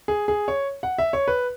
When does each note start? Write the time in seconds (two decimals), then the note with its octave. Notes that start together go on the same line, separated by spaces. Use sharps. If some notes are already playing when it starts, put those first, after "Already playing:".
0.08 G#4
0.28 G#4
0.48 C#5
0.83 F#5
0.98 E5
1.13 C#5
1.28 B4